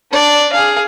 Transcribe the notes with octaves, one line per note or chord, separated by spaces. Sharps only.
D4 D5
G#4 F5